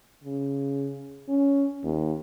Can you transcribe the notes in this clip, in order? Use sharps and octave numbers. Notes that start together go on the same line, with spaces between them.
C#3
C#4
D#2